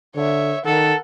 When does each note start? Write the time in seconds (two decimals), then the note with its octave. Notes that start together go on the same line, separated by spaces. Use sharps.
0.16 D3 C#5 E5
0.66 D#3 A4 A#4 F#5